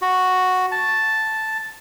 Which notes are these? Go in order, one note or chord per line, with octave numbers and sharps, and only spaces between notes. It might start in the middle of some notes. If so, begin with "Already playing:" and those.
F#4
A5